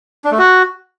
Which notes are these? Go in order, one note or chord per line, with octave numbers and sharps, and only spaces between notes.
D4
A3
F#4